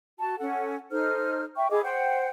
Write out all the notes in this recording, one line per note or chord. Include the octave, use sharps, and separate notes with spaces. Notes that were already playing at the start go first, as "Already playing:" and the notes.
F#4 A5
C#4 A4 F#5
D#4 A4 C5 F6
E5 G5 C#6
E4 G#4 D#5 D6
C5 F#5 G5